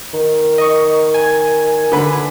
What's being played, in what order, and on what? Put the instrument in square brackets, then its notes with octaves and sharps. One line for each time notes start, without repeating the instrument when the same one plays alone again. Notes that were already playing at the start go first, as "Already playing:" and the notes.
[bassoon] D#3
[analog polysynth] D#5 C#6
G#5 G#6
[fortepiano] D3 B4